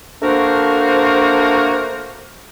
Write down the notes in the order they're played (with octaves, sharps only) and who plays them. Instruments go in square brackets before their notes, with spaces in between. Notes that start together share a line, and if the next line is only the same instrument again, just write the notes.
[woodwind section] A3 A#3 D4 F#4 A#4 C5